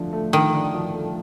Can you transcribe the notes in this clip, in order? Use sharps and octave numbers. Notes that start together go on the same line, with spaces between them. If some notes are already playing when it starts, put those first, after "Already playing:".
Already playing: D3 F3 A3 D4
A3
D3 D#3
D4
F3
A3